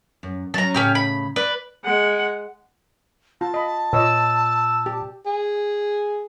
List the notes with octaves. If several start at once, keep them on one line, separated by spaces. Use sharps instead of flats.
F#2
F#3 C#4 A5 A#5
A2 C#3 C#4 G4 F6
B5
B4 D5
G#3 F#5
F4 A5
D#5 B5
A#2 B4 C#5 D#5 E6
G4
G#4